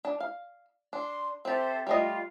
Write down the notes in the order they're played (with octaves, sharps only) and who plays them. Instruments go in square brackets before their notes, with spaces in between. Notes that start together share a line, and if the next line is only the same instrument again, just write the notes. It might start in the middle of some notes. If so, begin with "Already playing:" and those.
[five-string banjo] D4
F5
[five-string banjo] D4 [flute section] C6
[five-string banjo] C4 G4 [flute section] A4 C5 E5
[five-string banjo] G3 A3 D#5 [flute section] F4